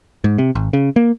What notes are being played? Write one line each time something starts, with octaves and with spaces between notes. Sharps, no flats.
G#2
C3
G#1
C#3
A#3